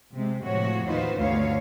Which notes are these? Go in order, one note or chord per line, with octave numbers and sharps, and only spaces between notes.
C3 G#3
A2 C3 F3 F#4 C#5
D#2 E3 D#4 F4 B4 C5
D2 G2 D3 B3 C#5 F5